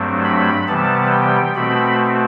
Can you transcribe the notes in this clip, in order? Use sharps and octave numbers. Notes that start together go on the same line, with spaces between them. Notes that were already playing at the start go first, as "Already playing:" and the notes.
Already playing: G2 F#3 A3 C4
B5
C3 E3 G3 B3 A5
G5
B2 A3 C4 B5